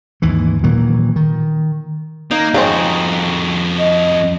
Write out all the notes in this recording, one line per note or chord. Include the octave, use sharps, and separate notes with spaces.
D#2 G#2 E3
A#2 D#3 E3 F#3
D#3
A#3 D#4
F2 C#3 G#3 C4 F#4
D#5